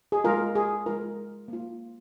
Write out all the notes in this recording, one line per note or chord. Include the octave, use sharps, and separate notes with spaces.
G#4
G#3 F4 A#4
G#4
G#3 F4 A#4
A#3 F4